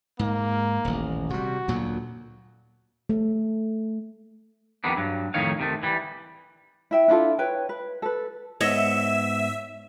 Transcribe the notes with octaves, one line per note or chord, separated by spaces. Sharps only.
G#2 A#3
D#1 A1
C3 G3 F#4
D2 A#2 F#3
A3
F2 D#3 G3 B3 D4
G2 F#3
F2 A2 D#3 D#4 C#5 F5
C3 D#3 A3
E3 G3
E4 E5 G5
D4 E4 F4 A4
B4 C#5 G5
B4
A4 B4
G#2 B3 C#5 D#5 E5 E6 E7